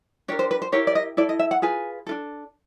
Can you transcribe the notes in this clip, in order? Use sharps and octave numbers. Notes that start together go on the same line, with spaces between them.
D4 G4 A#4 C#5
C5
B4
C5
E4 G4 A#4 C#5
D5
D#5
E4 A4 D5
D#5
E5
F#5
F4 G#4 B4 G#5
D4 F4 A4